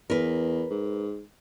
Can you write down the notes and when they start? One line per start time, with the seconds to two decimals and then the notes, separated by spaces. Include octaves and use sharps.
0.10 E2 A#4 B4
0.70 G#2